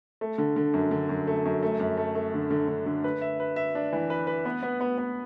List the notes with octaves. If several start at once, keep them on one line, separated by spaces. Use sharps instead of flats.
A3
D3
D3
F#2
D3
F#2
A3
F#2
A3
F#2
A3
A3
D3
D3
D3
D3
B4
E5
B4
E5
D4
E3
B4
B4
B3
B3
B3
B3